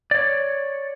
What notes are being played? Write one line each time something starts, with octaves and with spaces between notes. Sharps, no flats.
C#5 D5